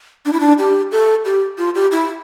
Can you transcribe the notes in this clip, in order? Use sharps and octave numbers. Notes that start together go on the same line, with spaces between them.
D4
E4
D4
G4
A4
G4
F4
G4
E4